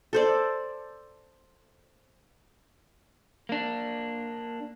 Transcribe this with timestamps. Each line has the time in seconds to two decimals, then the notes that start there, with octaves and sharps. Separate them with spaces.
0.13 A4 C5 D5
3.49 A#3 D4